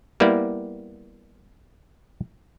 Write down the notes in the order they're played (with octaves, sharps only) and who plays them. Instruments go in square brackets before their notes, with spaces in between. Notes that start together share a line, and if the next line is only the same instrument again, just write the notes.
[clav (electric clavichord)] G3 A#3 B3 E4 D5